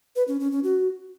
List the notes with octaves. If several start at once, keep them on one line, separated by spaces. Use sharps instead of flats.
B4
C#4
C#4
C#4
F#4